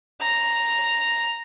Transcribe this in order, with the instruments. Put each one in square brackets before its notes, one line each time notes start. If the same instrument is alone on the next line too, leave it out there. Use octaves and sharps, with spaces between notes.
[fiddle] A#5